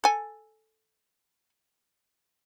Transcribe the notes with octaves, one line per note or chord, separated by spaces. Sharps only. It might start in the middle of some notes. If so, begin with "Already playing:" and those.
A4 G#5